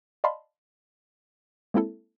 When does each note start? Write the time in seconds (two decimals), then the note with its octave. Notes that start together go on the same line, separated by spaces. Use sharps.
0.24 D5 D#5 F5 A5 B5 C6
1.74 G#3 A#3 C4 E4 A4